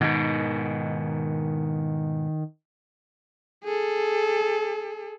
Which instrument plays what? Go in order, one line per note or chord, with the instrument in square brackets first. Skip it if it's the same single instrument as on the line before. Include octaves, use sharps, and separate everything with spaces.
[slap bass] G#2 B2 [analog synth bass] D#3
[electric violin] G#4 A4